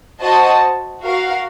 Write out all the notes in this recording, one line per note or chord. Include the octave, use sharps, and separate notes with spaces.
F#4 C5 D#5 A5
F#4 A#4 F5